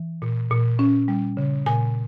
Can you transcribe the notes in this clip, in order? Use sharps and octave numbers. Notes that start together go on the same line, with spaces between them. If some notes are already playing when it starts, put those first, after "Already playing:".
Already playing: E3
A#2
A#2
C#4
G3
C#3
A#2 G#5